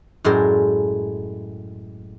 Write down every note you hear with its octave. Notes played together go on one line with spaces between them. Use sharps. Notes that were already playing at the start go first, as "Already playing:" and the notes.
F#2 A2 G#3 A#4 C5 D5